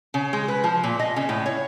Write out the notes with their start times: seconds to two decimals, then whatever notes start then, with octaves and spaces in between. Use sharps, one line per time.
0.14 C#3
0.33 G#3
0.48 B4
0.64 F3
0.84 A#2
0.99 D#5
1.16 C#3
1.29 A2
1.46 C#5